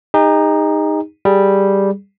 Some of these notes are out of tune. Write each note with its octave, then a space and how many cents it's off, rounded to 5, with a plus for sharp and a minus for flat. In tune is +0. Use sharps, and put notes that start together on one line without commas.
D#4 +0 G#4 -45
G3 +0 G#4 +0